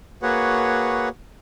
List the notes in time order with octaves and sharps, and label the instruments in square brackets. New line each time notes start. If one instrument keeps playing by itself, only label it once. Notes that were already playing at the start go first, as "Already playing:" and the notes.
[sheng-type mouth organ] A#3 F#4 G#4 B4 C#5 F#5